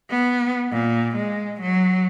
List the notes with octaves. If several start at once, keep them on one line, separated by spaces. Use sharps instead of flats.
B3
A#2
G#3
F#3